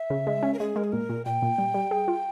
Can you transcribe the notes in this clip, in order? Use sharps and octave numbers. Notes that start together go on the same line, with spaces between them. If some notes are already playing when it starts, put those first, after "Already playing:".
Already playing: E5
C#3
G#3
C#4
A#4
G#3 G#4
G#3 A#4
G#4
A#2 A#4
A#2
A#2 G5
A#2
G3
G3
G#4
F4